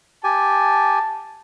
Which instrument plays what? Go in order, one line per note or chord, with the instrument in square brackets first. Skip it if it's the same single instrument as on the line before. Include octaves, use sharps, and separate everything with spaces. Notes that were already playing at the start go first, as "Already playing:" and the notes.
[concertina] G4 G#5 [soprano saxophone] A5